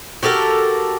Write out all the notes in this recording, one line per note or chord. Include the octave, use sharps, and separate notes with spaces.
F#4 G4 A4 A#4